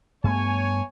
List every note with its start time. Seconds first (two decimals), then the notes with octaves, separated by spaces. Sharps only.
0.24 G2 A3 B3 C#5 G#5